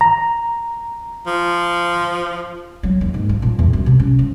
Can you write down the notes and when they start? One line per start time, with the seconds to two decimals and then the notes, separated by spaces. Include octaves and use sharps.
0.01 A#5
1.27 F3
2.83 F#3
3.01 D#2
3.14 G#2
3.29 F3
3.42 A#2
3.59 E2
3.73 F#2
3.86 C3
4.00 C#4
4.19 F3